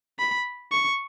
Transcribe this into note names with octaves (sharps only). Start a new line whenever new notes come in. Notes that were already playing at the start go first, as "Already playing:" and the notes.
B5
C#6